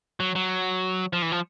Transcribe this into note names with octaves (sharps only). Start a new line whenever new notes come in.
F#3
F#3
F3
E3
F3